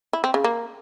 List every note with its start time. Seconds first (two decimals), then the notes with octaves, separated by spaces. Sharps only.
0.13 E4
0.24 C4
0.34 C#3
0.44 A#3